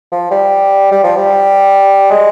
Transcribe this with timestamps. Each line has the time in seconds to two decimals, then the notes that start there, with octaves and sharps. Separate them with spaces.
0.12 F3
0.31 G3
0.92 G3
1.04 F3
1.16 G3
2.11 G#3